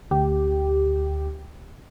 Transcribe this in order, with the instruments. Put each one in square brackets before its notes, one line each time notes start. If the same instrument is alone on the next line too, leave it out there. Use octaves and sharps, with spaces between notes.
[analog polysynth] D2 G4